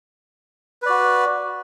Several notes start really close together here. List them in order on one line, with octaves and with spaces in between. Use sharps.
B4 D5 F#4